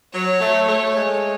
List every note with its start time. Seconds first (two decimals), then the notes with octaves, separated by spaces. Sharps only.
0.13 F#3 C#5
0.40 A3
0.68 A3 C#5
0.95 G#3